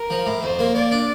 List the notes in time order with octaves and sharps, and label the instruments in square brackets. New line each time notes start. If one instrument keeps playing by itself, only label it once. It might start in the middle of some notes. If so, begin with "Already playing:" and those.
Already playing: [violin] A#4
[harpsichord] F3
A2
[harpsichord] F2 [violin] C5
[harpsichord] A#3
[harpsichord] A#3 [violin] D5
[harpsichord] D4